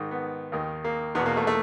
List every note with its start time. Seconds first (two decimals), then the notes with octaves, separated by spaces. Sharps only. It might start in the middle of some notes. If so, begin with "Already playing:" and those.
Already playing: G#2 D#3
0.11 B3
0.52 D#2 D#3
0.84 A#3
1.15 E2 B3
1.19 B2
1.26 A#3
1.37 A3
1.47 A3